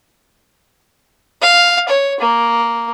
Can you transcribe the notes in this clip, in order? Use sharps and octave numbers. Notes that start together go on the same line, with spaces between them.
F5
C#5
A#3